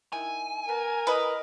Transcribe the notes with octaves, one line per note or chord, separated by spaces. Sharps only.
D#3 E4 G#5
B3 A#4
E4 B4 D#5